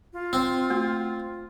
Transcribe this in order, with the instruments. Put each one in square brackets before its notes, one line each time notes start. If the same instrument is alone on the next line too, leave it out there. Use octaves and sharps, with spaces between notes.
[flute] F4
[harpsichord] C4
[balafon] A3 A#3 F#4